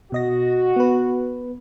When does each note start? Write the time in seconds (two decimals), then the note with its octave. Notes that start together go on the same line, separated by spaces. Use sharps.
0.12 B2 F#4 D#5 A#6
0.76 B3 B4